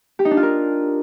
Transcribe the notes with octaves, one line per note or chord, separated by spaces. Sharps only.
G4
D#4
D4
F4
A#4